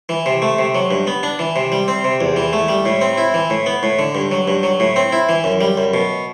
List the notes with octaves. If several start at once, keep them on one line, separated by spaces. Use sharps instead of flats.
E3
C3
A3
C3
F#3
G2
B3
D4
E3
C3
G3
C4
C3
E2
E3
A3
G3
A2
C4
E4
E3
A2
B3
A2
D3
G2
F#3
G2
F#3
A2
C4
E4
E3
F#2
G3
F#2
B2